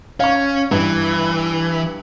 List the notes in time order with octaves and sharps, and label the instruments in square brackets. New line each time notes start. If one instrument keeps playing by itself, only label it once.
[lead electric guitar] C#4 [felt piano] F5 C#6
[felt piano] G2 [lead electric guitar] E3